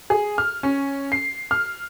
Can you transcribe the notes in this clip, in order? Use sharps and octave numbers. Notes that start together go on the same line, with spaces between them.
G#4
F6
C#4
C7
F6